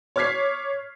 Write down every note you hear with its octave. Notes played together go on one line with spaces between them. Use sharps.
C#5 D6 F6 G#6 B6 C7